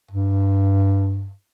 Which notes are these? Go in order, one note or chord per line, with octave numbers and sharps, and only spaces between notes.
G2